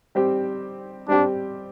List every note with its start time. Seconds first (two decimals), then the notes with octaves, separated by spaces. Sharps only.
0.15 G3 C4 G4
1.08 G3 C4 D4 G4